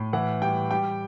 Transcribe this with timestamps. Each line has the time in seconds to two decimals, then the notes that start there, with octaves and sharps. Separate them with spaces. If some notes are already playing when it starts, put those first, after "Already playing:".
Already playing: A2
0.13 E3 F#5
0.42 G3 G5
0.71 G3 G5